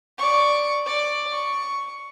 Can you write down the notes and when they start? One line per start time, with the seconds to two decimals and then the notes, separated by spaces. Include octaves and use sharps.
0.18 D5 C#6
0.86 D5
1.32 C#6